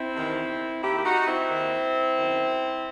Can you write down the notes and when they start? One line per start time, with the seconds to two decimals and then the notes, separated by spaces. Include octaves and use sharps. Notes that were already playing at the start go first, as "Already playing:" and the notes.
Already playing: C4 E4
0.16 E2 C3 D#3
0.82 D#2 D#3 E4 G4
0.97 G4
1.05 D#4 F#4
1.27 C4 E4
1.50 D#2 D#3
2.16 F#2 D#3